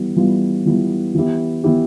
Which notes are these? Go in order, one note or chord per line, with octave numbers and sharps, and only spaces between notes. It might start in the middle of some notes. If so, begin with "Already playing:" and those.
Already playing: E3 G3 B3
E3 G3 B3 F4
E3 G3 B3 F4
E3 B3 E4 G4
E3 B3 E4 G4